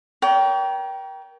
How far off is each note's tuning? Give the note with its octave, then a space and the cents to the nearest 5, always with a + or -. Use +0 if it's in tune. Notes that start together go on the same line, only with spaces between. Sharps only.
A#4 +30 C#5 +45 G5 -15